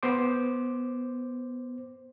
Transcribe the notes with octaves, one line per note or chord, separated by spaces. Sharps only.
B3 C5 D6